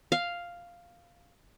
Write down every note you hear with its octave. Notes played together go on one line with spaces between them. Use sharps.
F5